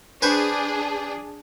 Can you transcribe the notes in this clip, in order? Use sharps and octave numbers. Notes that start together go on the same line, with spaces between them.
D4 G#4 B4 C5 C#6